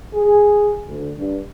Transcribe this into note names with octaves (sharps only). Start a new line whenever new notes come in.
G#4
D2
G2